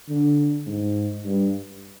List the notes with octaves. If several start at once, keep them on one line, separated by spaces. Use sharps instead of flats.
D3
G#2
G2